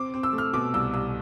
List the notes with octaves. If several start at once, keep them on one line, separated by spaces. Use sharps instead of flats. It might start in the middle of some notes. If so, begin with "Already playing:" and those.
Already playing: C4 D6
C4
E6
A3
F6
B2 D6
C2 E6
C2 E6